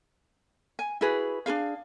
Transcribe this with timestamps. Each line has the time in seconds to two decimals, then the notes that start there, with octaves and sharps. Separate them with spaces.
0.79 G#5
1.01 E4 F#4 G#4 B4
1.46 D4 F4 G#4 F5